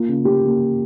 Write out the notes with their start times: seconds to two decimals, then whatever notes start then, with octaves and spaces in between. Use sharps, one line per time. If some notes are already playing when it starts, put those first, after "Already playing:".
Already playing: A#3 F4
0.08 C#3
0.25 A#3 G4
0.43 A#3